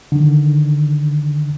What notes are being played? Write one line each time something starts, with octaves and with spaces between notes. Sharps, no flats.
D3 D#3